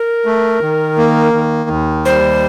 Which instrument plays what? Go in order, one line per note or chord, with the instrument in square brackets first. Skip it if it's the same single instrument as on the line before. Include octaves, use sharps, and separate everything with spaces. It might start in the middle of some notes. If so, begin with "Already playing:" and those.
Already playing: [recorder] A#4
[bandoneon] A3
D#3
A#3
D#3
D#2
[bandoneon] G3 [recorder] C5